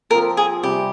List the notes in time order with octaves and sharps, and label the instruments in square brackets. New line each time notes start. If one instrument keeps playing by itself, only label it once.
[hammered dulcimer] F3 C4 F4 [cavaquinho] A#4
[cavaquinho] G#4
[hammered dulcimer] C3 G3 C4 [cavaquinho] G4